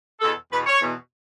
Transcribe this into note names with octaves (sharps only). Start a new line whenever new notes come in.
E2 B2 A4
E2 B2 B4
C#5
E2 B2